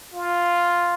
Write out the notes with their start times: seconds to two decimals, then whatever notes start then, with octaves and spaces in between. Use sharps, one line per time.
0.14 F4